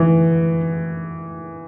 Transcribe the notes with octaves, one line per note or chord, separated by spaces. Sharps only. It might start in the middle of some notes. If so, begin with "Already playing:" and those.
Already playing: E3